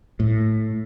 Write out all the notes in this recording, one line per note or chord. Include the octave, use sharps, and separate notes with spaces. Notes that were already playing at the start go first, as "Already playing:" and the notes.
A2